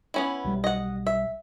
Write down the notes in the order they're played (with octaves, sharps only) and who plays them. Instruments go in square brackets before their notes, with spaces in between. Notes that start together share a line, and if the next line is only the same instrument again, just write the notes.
[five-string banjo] B3 C#4 E4
[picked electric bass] B1 G3
[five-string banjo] D#5 F#5
E5